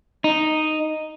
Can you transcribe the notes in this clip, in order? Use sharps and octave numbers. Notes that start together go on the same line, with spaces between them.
D#4